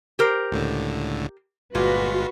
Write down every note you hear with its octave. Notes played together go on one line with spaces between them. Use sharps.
G4 A#4 C5
C#2 A2 D3
G1 A#2 G#3 F4 F#4 B4